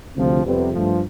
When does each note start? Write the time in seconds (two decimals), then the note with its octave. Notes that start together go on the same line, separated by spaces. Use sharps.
0.15 D2 C3 F3 C4
0.44 F2 C3 G3 B3
0.72 G2 F3 A3